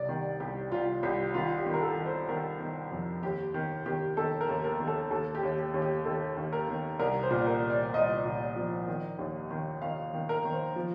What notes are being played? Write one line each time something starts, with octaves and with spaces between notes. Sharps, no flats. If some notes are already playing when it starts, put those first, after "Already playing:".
Already playing: C2 C3 D5
D#3
C2 G4
C2 F4
C2 G4
D#3 F4
G4
D#3
A#4
A4
D#3
C5
D#3 A#4
D#3
F2
D#2 G4
D#3
D#3 G4
D#3 A4
A#4
D#2
A#4
D#3
A4
D#2 A4
G4
D#2
G4
D#2
G4
D#3 A4
D#2
A#4
D#3
C2 A#4
C5
A#2
A#4
C2
D5
C2 D#5
A#2
F3
D#3
D#2
D#3
D#3 F5
D#3
A#4
D#3
C5
F3